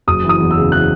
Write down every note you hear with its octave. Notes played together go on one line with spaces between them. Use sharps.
F#1 D#6
E3
D#6
E2
E6
C#3
E3 F#6